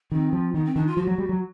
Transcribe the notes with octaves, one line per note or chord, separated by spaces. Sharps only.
D#3 C4
F3
D#3 B3
C4
D#3 D4
F4
F3 F#4
F#3
G3
F#3